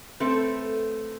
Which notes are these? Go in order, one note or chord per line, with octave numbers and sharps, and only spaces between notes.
A3 C4 A4 B4